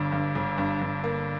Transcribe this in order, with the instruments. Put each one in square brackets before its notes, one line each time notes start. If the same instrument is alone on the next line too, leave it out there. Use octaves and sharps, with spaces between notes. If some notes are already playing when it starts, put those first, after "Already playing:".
Already playing: [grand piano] G1 G2 [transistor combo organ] D3
[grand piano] G2
G1
G2
G2
A#3